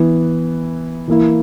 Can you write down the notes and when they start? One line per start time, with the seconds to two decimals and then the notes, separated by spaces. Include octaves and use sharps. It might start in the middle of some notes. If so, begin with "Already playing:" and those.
Already playing: E3 B3 E4
1.08 E3 A#3 E4